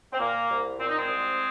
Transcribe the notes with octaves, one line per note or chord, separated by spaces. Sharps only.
C4
A#2 A#3
C2
A#2 C4
D#4
G#3 C4
C2